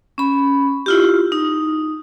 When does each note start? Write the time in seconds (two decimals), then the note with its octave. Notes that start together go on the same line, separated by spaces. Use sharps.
0.18 C#4 B5
0.86 E4 F4 G4
1.32 D#4